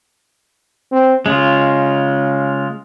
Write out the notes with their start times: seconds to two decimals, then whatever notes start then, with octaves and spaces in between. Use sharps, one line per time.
0.92 C4
1.26 C#3 G#3 F4